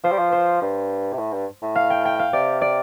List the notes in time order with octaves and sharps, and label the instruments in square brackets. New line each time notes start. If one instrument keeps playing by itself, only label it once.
[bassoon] F3 [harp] C5
[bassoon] G3
F3
[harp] C5
[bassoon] G2
C3
A2
G2
A2
[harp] F5
G5
G5
F5
[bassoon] C3 [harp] D5
[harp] D5